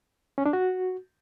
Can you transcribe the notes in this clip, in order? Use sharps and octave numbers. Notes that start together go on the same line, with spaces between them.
C#4
D4
F#4